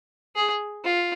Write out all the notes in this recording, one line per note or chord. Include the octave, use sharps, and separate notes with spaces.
G#4
F4